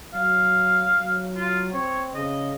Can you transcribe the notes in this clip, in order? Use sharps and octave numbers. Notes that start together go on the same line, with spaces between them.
F#3 F5
F#3
F4
C4 C#5
C#3 D#5